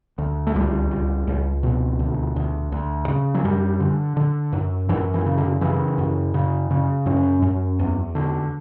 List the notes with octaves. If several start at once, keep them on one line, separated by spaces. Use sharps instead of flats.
D2
A3
C#2 G3
C#2
C#2
B2
D2
D2
D2
C#3
F#3
F#2 G3
D3
D3
F#2
F#2 E3
E3
C#3
D3
C#3 E3
F#2
C#3
C#3
F#2 C#4
F#2
E2
D3